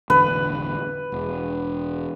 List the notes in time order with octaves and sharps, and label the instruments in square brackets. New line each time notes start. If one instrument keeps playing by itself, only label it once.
[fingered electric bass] E1 A1 D3 [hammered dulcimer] B4
[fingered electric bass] E1